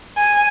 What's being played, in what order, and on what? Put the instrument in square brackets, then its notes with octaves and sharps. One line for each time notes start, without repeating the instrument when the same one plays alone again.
[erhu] G#5